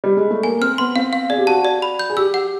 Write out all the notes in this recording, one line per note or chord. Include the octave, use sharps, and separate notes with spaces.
G3
G#3
A3
A#3 G#5
C4 F6
B3 C6
C4 F5
F5
G#4 D5
G4
F#4 A5
D5
B5
G6
G#4
G4 E6
F#5